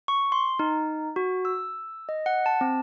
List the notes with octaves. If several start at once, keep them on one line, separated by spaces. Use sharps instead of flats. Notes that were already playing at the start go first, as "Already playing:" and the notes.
C#6
C6
D#4
F#4
E6
D#5
F#5
A5
C4